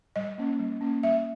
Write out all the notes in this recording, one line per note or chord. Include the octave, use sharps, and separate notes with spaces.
G3 D#5
A#3 C#4
G3
A#3 C#4
G3 E5